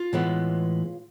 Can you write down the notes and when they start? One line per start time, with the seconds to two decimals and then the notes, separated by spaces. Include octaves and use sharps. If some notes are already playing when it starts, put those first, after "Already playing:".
Already playing: F4
0.13 A2 E3 G#3 B3